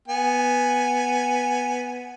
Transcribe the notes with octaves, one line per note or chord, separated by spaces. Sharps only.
B3 G#5